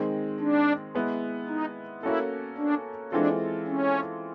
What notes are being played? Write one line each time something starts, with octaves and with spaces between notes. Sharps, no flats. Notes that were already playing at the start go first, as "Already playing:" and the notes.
Already playing: D#3 G#3 C4
D4
G#3 B3 E4
D#4
A#3 C#4 E4 F#4 A4
D4
E3 G#3 C4 D4 F4 A4
C#4